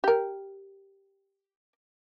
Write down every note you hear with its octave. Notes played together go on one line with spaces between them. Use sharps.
G4 A#4